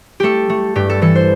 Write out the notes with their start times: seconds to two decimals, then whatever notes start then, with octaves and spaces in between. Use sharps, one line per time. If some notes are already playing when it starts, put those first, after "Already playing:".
0.20 A3 G4 A4
0.50 A3
0.75 G2 G4
0.90 A4
1.02 E3 A4
1.15 C5